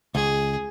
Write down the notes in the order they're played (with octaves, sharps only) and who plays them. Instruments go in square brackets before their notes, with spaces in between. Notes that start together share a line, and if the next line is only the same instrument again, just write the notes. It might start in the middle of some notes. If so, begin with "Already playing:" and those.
[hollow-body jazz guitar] C#2 [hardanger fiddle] G#4